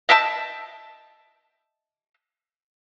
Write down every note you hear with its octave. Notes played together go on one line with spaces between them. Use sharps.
D#5 E5 G5 A5